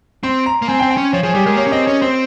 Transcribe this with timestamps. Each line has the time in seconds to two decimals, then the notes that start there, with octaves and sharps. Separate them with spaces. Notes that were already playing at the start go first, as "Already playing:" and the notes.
0.23 C4 C6
0.46 A#5
0.62 A#3
0.68 C4 G#5
0.79 G5
0.83 C4
0.91 G5
0.97 C#4
1.13 F3 C#5
1.23 F3 G#4
1.35 G3 G4
1.46 G#3 A#4
1.57 A#3 C#5
1.67 C#4
1.72 C4 D#5
1.87 C#4 C#5
2.01 C4 C5